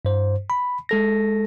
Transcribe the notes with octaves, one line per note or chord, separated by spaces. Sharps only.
G2 C5
B5
G#3 A4 A#6